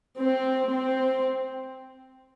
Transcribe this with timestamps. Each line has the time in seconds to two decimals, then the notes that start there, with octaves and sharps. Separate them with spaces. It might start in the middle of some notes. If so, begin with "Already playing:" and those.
0.20 C4
0.71 C4